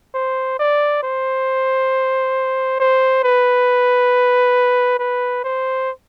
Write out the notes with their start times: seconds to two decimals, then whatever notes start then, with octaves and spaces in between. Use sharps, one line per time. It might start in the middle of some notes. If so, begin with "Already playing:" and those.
0.15 C5
0.59 D5
1.03 C5
2.80 C5
3.24 B4
4.99 B4
5.44 C5